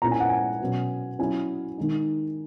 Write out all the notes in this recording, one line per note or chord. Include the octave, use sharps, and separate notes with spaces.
A#2 A#3 C#4 E4 A#5
G#5
F#5
G#5
B2 F#3 C#4
F#3 C#4 E4 G#5
D#3 G#3 D#4